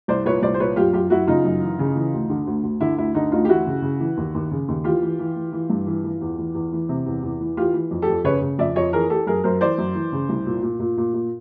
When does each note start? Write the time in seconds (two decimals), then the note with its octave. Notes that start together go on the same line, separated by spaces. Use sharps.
0.08 C2 C5 D5
0.25 A#2 B4 C#5
0.42 C2 C5 D5
0.54 C5
0.60 A#2 B4 C#5
0.76 F#2 F4 G4
0.93 F#2 F4 G4
1.10 F#2 E4 F#4
1.27 C#3 D#4 F4
1.45 F#2
1.62 E3
1.79 C#3
1.95 E3
2.13 D2
2.30 D3
2.47 D2
2.63 D2
2.81 D3 E4
2.97 D2 E4
3.15 D3 D#4
3.32 D2 D#4 F4
3.45 G4
3.49 E3 E4 F#4
3.66 C#3
3.82 C#3
4.00 E3
4.17 D#2
4.34 D#2
4.51 C#3
4.68 D#2
4.84 E3 F4 G4
5.02 E3
5.19 E3
5.36 E3
5.52 E3
5.70 G2
5.87 E3
6.04 E3
6.21 E2
6.38 E3
6.55 E2
6.73 E3
6.89 C3
7.06 E2
7.23 E2
7.40 E3
7.57 E3 F4 G4
7.74 E3
7.91 F2
8.02 G4 A4
8.08 F2
8.24 C#3 B4 C#5
8.42 C#3
8.58 F2 D5 E5
8.75 F2 C#5 D#5
8.93 E3 G#4 A#4
9.10 E3 G4 A4
9.27 F#2 G#4 A#4
9.43 F#2 A#4 C5
9.61 E3 C5 D5
9.78 F#2
9.95 E3
10.12 C#3
10.29 C2
10.46 A#2
10.62 A#2
10.79 A#2
10.97 A#2
11.14 A#2